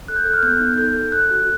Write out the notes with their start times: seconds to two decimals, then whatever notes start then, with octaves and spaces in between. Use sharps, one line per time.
0.08 A4 F#6
0.16 G6
0.25 A4 F#6
0.34 F6
0.43 B3 G6
0.60 D#4
0.78 A4 G6
0.96 A4
1.12 A4 F#6
1.31 F#4